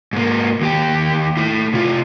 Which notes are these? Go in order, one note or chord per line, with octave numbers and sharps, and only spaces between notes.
G#2 A#3
D#2 G4
A2 E4
C3 F4